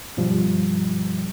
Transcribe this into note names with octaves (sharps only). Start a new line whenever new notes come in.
G2 B2 F3 G3